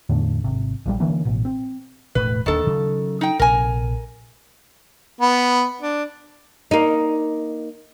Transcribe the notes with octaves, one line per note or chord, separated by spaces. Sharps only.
E2 A2 D3 A3
G#1 C3
A#1 A#2 E3 G3
D3 E3 A#3 C#4
A1 B2
C4
E1 A2 A3 B4
D1 D#2 D#3 D4 A4
C#3 F#3
D#4 G5
A#1 C3 A#4 G#5
B3
D4
A#3 D#4